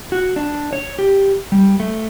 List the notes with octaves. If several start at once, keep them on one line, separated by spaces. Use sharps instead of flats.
F#4
D4
C#5
G4
G3
A3